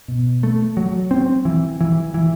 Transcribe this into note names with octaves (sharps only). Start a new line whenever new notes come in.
B2
A3
F#3
C4
E3
E3
E3